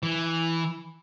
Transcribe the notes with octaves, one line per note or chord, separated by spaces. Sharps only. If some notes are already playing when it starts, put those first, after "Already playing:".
E3